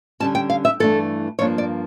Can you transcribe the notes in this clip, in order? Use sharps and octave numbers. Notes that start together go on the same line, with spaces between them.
D3 G3 C#4 A5
G5
F5
E5
G2 E3 A3 D4 A4
G2 F3 A#3 D4 C#5
D5